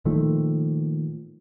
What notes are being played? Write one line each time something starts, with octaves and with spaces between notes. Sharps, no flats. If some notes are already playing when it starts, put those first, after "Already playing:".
A#2 D#3 F3 A3